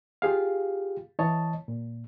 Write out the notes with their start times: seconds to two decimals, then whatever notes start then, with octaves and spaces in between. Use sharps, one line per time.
0.22 F4 G4 G#4 F5
1.19 E3 C#5 D#5 A5
1.68 A#2